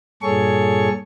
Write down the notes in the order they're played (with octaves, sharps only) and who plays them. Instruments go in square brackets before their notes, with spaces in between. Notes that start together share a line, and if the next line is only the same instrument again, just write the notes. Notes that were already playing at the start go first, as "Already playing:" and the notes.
[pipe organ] G2 A#2 G#4 A4 C#5 C#6